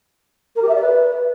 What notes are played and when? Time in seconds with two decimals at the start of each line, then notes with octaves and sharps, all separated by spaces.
0.55 A#4
0.61 G4
0.68 E5
0.74 D5
0.81 B4